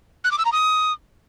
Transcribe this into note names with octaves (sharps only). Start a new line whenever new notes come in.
F#6
D6
E6
A#5
D#6